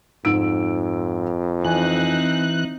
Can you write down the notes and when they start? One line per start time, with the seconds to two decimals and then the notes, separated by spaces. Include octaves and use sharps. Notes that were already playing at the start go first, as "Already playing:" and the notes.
0.25 F2 G#2 E6 D7
1.65 E3 C4 D#4 G#5 F#6